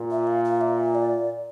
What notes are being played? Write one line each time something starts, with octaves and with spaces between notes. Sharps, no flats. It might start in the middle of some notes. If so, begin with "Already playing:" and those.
Already playing: A#2
E5
F5
F5
E5
D5